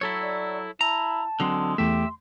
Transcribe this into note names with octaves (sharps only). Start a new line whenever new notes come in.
F#3 E4 A4 C#5
D5
E4 A5 A#5
D3 F#3 G#3 C4
E2 A3 G4 E5 C6